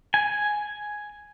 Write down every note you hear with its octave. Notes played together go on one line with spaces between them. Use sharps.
G#5